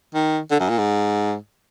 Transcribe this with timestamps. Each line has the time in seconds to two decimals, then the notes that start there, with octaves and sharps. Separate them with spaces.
0.14 D#3
0.51 D3
0.60 F#2
0.69 A#2
0.78 G#2